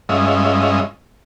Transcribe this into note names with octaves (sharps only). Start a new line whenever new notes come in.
G2 G#3 C#4 F4 D#5 E5